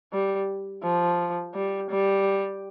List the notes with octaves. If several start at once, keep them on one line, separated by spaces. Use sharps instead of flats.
G3
F3
G3
G3